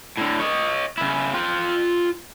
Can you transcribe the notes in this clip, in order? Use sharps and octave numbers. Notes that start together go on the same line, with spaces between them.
A2 D3
C#5 D#5
C#3 E4
F4 G5